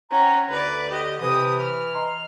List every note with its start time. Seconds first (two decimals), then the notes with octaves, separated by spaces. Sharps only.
0.11 C#4 C5 F#5 G5 A#5
0.49 D2 D3 B4 D5 B5
0.90 G4 D#5
1.21 C3 E3 G4 D#6
1.60 F6
1.94 D#5 A#5 C6